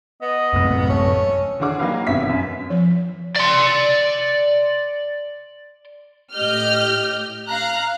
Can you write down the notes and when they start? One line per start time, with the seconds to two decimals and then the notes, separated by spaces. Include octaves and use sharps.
0.22 B3 D#5
0.53 F#2 A2 C3
0.90 A3 C#4
1.60 D3 E3 D4 F#4 G#4 D6
1.79 F#3 A#3 D#4 G4 B4 F5
2.07 G#1 B2 B3 C#4 E5 B6
2.29 F#2
2.70 F3
3.36 D5 C6
6.34 A2 G4 D#5 F6 G6
7.49 F5 A#5 F#6